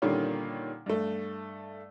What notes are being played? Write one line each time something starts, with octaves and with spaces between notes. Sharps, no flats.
A#2 D3 D#3 G3 A#3 C#4
G2 A3